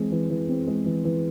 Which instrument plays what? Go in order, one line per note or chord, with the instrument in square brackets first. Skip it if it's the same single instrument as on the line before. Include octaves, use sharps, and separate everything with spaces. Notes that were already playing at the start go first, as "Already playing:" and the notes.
Already playing: [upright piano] E3 G#3 C4
E3
E3
C4
G#3
E3
E3